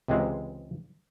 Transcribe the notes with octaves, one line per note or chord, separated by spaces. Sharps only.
C#2 C3 E3 G#3